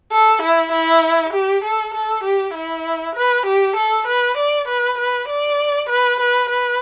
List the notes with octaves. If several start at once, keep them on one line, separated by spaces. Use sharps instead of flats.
A4
E4
E4
G4
A4
A4
G4
E4
B4
G4
A4
B4
D5
B4
B4
D5
B4
B4
B4